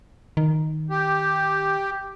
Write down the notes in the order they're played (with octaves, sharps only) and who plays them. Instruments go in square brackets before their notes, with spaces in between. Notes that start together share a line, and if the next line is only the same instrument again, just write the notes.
[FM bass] D#3
[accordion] G4